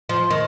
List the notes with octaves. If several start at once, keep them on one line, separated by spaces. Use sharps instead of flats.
F3
D#3